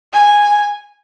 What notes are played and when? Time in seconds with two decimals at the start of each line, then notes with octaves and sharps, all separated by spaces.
0.13 G#5